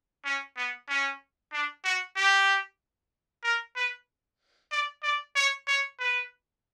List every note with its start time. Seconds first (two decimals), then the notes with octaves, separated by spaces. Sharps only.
0.25 C#4
0.57 B3
0.89 C#4
1.53 D4
1.85 F#4
2.16 G4
3.44 A#4
3.76 B4
4.72 D5
5.03 D5
5.36 C#5
5.68 C#5
6.00 B4